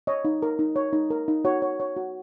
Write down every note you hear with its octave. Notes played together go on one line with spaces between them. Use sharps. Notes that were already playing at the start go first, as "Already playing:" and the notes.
C#5 D#5
D#4
A#4
D#4
C#5
D#4
A#4
D#4
F#4 C#5
C#5
C#5
F#4